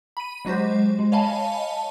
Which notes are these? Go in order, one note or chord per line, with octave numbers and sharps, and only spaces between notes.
B5 D#7
F#3 G#3 F#4 G4 C5
G#3
C#5 D#5 F5 G#5 A5 B5